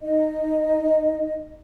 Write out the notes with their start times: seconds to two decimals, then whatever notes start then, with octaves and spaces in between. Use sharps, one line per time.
0.01 D#4 D#5